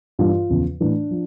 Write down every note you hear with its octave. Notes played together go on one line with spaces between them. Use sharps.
G2 E3 F4
E2 C#3 F3
A2 E3 D4
F3